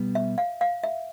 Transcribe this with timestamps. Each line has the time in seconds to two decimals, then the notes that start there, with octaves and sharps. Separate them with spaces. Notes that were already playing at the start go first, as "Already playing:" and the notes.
Already playing: B2 G3 B3
0.15 E5
0.38 F5
0.61 F5
0.83 E5